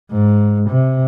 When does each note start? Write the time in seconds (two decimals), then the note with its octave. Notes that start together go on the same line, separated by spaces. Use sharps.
0.11 G#2
0.69 C3